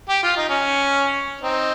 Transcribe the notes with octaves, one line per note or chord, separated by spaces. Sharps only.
G4
F4
D#4
C#4
C4 D#4